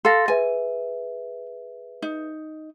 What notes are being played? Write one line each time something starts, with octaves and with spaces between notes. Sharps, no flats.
A4 F5 C6 A6 A#6
G#4 B4 E5 G#5
D#4